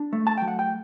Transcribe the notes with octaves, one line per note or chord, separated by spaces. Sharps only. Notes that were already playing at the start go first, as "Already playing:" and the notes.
Already playing: D4
A3
A5
F#3 G5
F#5
G5